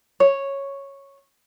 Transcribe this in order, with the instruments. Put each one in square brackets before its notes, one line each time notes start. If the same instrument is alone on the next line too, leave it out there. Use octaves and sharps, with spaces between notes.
[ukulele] C#5